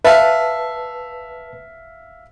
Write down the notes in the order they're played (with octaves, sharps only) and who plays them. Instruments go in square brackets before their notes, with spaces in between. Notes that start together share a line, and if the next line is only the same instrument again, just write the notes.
[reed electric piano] B4 A5 [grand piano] E5 F5